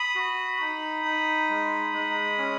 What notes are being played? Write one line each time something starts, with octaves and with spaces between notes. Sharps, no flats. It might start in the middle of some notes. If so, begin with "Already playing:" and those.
Already playing: B5 D#6
F#4
D#4
D#4
G#3
G#3
C#4